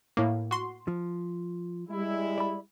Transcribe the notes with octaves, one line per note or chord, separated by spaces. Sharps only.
A2 A#3
F#4 C6
F3
G3 G#3 E4
D5 B5